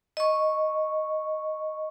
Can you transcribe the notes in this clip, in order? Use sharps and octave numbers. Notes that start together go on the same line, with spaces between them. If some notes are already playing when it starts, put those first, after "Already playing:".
D#5 C#6